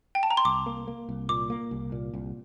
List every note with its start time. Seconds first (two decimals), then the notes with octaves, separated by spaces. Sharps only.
0.15 G5
0.23 A5
0.30 A#5
0.37 C6
0.45 C2 D6
0.66 A#3
0.87 A#3
1.09 C2
1.29 A#2 D6
1.50 A#3
1.71 C2
1.92 A#2
2.14 C2